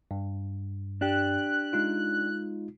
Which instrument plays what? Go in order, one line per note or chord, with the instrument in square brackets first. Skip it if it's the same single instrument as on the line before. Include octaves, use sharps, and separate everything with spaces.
[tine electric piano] G2
[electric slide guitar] D4 G4 [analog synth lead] F#6
[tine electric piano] G#3 D#4 F4